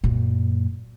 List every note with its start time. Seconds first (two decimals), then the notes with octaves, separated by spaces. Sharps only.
0.04 F#2 A#2